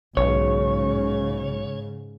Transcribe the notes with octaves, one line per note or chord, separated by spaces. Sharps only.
B1 G#2 C#3 C#5